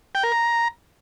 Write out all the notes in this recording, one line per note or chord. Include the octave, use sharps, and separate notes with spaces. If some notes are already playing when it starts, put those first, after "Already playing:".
G5
A#4
A#5